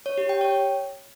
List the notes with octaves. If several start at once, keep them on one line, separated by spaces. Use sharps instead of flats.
C#5
G4
G5
C#5